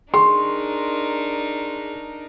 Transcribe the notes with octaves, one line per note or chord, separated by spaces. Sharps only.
D4 D#4 G#4 A#4 C6 C#6